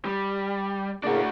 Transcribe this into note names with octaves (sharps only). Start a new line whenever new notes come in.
G3
A2 C#3 A#3 D4 F#4